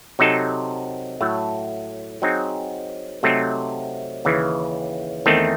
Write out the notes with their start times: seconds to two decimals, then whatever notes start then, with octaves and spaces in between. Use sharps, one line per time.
0.19 C3 F#3 C4 D#4 A4
1.21 A2 F#3 A3
2.22 F#3 C4 D#4 G#4
3.23 C3 F#3 A3 C4 D#4
4.25 D#2 C#3 E3
5.26 E2 D#3 A3 C4 D#4